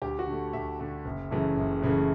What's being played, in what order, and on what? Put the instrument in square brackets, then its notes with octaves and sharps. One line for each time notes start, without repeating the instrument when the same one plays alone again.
[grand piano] D2 G4
F#4
D3
A3
D2 E5
D3 A3
F#1
F#2 C#3 E3 A3
F#1
F#2 C#3 E3 A3